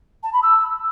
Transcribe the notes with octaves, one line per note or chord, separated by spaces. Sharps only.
A5
B5
E6